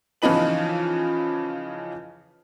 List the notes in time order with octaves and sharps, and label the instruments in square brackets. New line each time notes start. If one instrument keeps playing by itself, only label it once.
[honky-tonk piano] C#3 E3 F3 D#4 B4 F#7